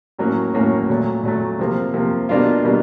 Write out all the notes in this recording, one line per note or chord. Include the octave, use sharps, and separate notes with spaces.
A2 F#3 A#3 C#4
A2 F#3 A#3 C#4
A#2 F#3 A3
A#2 F#3 A3
C3 F3 A#3
C3 F3 A#3
B2 G3 A#3 D4 F4
B2 G3 A#3 D4